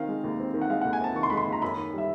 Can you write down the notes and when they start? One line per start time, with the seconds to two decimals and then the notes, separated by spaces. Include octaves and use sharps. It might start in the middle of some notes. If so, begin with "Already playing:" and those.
Already playing: D#3 C4 F5
0.08 G#3
0.24 D#2
0.40 C4
0.54 D#3
0.62 F#5
0.70 G#3 F5
0.82 D#2 F#5
0.93 G#5
1.01 C4 A5
1.15 D#3 C#6
1.23 C6
1.30 G#3 B5
1.37 C6
1.47 D#2
1.52 A#5
1.62 F#2 B5
1.77 D#3
1.93 G3 E5